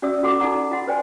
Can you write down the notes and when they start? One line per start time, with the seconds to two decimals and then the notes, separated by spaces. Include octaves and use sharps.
0.02 C#4 F#4 D5 E5 D#6 E6
0.23 F4 F#4 A4 F#5 C6 D6
0.40 D#4 A4 D5 F#5 A#5 D#6
0.71 F4 D#5 F#5 C6
0.87 B4 C5 D5 G5 G#5